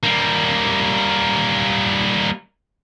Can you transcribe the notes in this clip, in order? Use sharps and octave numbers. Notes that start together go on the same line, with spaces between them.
G3 A#3